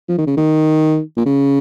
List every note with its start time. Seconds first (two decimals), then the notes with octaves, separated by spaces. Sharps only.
0.09 F3
0.18 D#3
0.27 C#3
0.37 D#3
1.17 A#2
1.26 C#3